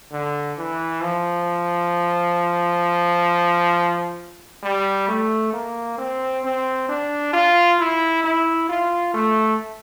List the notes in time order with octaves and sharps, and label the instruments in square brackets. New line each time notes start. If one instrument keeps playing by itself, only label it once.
[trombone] D3
E3
F3
G3
A3
A#3
C4
C4
D4
F4
E4
E4
F4
A3